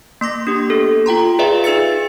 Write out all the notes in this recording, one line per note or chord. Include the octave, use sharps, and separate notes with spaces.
A#3 C6 D6 A#6
D4 G4
A#3 B3 A4
F4 G5 A#5 C6
F4 G#4 B4 D5 E5 F5
D#4 G#4 E6 A6 C#7